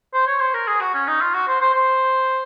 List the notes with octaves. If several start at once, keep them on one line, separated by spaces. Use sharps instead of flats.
C5
C#5
C5
A#4
G#4
F#4
C#4
D#4
F4
F#4
C5
C5
C5